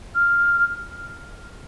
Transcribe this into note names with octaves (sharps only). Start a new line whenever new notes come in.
F6